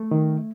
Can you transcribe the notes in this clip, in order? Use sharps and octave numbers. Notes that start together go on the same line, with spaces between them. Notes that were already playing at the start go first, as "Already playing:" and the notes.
Already playing: A3
D#3